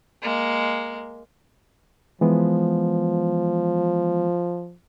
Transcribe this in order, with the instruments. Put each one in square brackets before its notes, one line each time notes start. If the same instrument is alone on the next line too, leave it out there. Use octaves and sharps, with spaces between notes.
[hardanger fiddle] G#3 A#3
[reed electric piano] E3 G#3 B3 [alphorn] F3